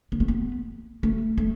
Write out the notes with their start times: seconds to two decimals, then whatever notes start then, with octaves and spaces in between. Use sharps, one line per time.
0.12 B3
0.20 A3
0.28 B3
1.03 A3
1.38 A3